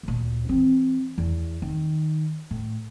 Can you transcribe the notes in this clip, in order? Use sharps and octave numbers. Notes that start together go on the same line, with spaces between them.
D2 A#2
E3 C4
E2
D#3
A2